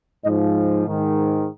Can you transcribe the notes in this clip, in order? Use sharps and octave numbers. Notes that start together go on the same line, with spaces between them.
G#2 F3 D#5
G#2 D#3